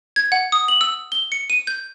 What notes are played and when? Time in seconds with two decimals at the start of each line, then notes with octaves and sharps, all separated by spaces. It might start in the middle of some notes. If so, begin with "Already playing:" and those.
0.16 G#6
0.32 F#5
0.52 D#6
0.68 F#7
0.81 E6
1.12 G7
1.32 C#7
1.50 D#7
1.67 G6